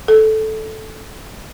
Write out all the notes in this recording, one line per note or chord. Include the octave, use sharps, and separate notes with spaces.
A4